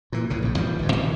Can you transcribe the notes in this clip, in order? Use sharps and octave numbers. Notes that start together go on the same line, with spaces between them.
A#2 E3
C2 A2 C#3
A#1 G#2
D#2 E3 F3 G3
G1 G#2
A#2 D#3 E3 G3